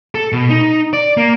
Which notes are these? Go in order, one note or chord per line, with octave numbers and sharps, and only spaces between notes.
A4
B2
D#4
D5
A#3